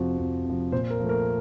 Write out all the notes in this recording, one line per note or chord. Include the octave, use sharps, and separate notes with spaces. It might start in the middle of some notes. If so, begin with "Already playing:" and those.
Already playing: F2 C3 F3 F#4
F2
C3 F3
A#2 C5
A#4
F3 A3
A#4